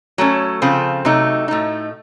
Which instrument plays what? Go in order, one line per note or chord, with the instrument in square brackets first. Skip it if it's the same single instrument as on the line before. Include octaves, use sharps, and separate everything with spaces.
[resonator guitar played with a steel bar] F#3 A3 C#4 A4
C#3 F3 C4 F4 A4
C3 F#3 A3 D#4
A2 A3 D#4